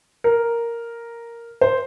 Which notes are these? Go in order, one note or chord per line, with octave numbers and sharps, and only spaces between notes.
A#4
C5